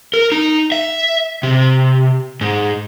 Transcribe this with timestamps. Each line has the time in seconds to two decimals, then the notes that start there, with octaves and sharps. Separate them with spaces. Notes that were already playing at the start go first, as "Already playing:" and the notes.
0.14 A#4
0.32 D#4
0.72 E5
1.43 C3
2.41 G#2